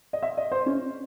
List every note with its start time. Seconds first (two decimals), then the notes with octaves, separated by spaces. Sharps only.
0.13 D#5
0.23 E5
0.37 D#5
0.52 C5
0.66 C#4